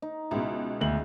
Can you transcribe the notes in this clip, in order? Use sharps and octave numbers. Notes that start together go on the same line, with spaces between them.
D#4
C#2 B2 G#3 E4
D2 F#7